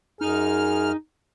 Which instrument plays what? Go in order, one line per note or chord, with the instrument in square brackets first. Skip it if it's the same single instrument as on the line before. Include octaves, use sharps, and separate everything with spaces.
[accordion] F#2 F6 [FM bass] D#4 [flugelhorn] G#4